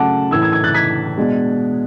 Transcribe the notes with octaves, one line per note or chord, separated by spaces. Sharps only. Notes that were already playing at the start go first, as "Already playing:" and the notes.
Already playing: C#3 F#3 A3 C#4 F#5 A5 D6
A2 E3 A3 E4 E6 G#6
E6 G#6
E6 G#6
F#6 A6
G#6 B6
B2 G#3 D4